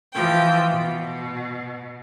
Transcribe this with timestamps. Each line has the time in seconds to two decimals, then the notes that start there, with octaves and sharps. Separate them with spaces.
0.12 E3 F3 G5
0.70 B2